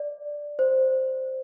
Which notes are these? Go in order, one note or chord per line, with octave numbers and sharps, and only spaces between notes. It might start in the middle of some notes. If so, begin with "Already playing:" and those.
Already playing: D5
C5